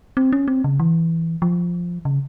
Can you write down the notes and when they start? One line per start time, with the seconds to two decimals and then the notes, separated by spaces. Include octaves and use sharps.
0.17 C4
0.33 C#4
0.48 C4
0.64 C#3
0.80 E3
1.42 F3
2.05 C#3